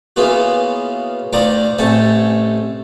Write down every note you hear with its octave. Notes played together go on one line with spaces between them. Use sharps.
C#3 E3 A#3 B3 F4 F#4
D2 D#3 F4 D5 A#5 D6
A1 C3 A3 A4 G#5 A5